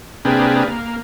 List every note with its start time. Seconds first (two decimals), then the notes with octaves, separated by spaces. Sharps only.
0.25 C3 A#3 D4 G4 G#4 B4
0.65 A#3